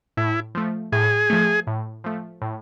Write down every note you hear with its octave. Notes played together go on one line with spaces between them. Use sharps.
A2 E4
F3 A3
A2 G#4
F3 A3
A2
F3 A3
A2